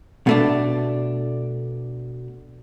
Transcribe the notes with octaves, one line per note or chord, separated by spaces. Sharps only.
B2 A3 D4